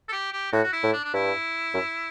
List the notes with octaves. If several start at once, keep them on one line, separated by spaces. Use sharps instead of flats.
A4
G4
G4
A2 F#4
F#4
E4
A2
D4
D4
G2 E4
F#2